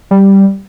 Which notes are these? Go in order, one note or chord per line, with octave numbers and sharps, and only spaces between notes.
G3